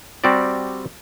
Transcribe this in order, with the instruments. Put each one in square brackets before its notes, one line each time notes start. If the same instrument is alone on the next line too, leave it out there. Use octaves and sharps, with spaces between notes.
[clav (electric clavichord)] G3 C4 F#4 G4 D5